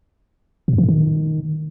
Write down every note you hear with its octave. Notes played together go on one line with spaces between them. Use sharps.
B2
G2
E3
A2
D#3